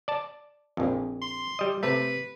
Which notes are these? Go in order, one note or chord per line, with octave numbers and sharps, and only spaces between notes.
D5 A5
A#1 F2
C6
G3 D#5
C3 A3 B4